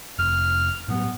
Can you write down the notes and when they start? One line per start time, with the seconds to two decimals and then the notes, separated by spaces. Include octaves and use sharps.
0.19 F1 F6
0.88 A2 F#3 G3 B3